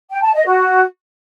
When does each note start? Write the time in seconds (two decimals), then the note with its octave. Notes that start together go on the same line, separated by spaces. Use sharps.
0.10 G5
0.22 A5
0.34 D#5
0.46 F#4